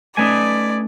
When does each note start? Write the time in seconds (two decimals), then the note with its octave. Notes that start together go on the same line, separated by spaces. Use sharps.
0.17 A3 C#4 D#4 B4 D5 G#5